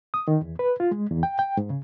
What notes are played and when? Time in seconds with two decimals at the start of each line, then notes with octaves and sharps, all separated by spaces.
0.14 D#6
0.28 D#3
0.42 E2
0.59 B4
0.80 F4
0.91 G#3
1.11 E2
1.23 G5
1.39 G5
1.57 G#2
1.70 C#3